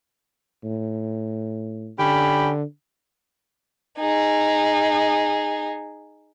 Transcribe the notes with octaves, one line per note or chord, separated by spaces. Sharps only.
A2
D3 C#4 G4 B5
D#4 G#4